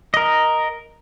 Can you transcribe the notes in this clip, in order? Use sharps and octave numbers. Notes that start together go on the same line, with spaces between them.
A#4 D#5